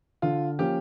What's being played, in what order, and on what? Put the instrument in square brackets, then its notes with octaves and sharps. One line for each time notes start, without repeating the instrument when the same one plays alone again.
[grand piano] D3 [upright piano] F4
[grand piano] F3 A#3 C#4 [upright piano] G4